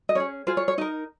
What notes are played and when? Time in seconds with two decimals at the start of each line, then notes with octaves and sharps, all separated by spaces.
0.09 D#5
0.15 C#4 G#4 C#5
0.47 F4 G#4 C5
0.57 C#5
0.68 C#5
0.78 D#4 A#4 D#5